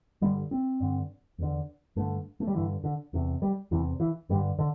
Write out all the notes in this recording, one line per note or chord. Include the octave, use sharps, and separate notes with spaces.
G2 D3 G3
C4
G2 D3
E2 D3
G2 D3 A3
A3
G3
G2 D3 E3
D3
E2 C3
G3
E2 C3 E3
E3
G2 D3 G3
D3